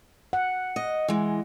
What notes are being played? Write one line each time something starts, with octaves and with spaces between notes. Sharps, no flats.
F#5
D#5
E3 G#3